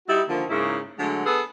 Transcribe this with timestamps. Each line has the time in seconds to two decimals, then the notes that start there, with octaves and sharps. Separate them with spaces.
0.08 G3 D#4 E4 F#4
0.28 D3 D#3 F3 A#3
0.49 G#2 C#3 A#3 E4
0.98 D3 F#3 G#3 A3
1.25 B3 G#4 A4 B4